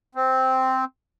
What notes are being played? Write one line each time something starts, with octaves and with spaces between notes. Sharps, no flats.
C4